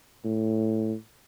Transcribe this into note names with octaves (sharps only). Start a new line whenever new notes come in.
A2